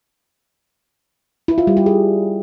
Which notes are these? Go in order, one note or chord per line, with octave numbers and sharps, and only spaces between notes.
E4
F4
G3
G4
G#4